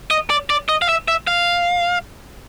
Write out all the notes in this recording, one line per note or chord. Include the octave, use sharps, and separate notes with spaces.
D#5
D5
D5
D#5
F5
E5
E5
F5